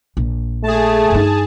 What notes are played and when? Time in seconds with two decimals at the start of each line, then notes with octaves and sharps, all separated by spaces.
0.17 A#1
0.64 A3 G#4 A5
1.10 G2 D#4